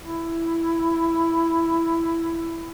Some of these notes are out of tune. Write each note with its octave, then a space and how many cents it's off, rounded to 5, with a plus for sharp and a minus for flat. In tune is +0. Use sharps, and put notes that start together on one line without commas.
E4 +10